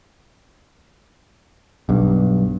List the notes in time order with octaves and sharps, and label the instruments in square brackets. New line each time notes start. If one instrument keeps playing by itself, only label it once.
[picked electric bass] B1 G2